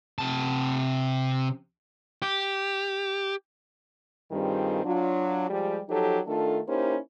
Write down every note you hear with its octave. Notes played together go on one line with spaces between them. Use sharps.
C3 A5
G4
G2 D#3 G3 C4 F4 G#4
F#3 D4 F4
F3 G3 G#3 G4 G#4
F3 F#3 D#4 G4 A4
D#3 A3 D4 F4 A4
A#3 C#4 D#4 E4 G4 C5